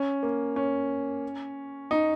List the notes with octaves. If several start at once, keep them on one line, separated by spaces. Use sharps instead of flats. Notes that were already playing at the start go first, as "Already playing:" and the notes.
Already playing: C#4
A#3
C#4
D#4